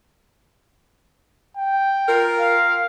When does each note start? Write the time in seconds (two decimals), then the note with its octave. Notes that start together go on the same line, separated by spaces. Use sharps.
1.57 G5
2.07 F4 A#4
2.40 F5